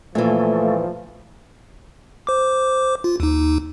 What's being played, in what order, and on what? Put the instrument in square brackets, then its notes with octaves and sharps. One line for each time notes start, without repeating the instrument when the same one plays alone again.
[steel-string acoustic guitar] A#2 E3 [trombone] F3 [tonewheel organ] A3
[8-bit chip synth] C5 D6
F4
D#2 D#4